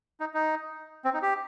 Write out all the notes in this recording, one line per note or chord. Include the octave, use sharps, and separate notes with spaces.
D#4
D#4
C4
D#4
G4